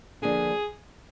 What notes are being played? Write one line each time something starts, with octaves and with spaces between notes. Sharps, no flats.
D3 F3 A#3 D4 G#4